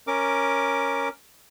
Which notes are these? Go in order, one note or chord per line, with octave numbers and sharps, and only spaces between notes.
C#4 A#4 D6